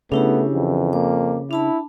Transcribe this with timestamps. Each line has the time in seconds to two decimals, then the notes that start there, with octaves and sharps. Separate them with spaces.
0.12 C#3 A3 B3 D4 E4 G4
0.54 F2 E3
0.93 A#3 D6
1.51 D4 E4 A5 B5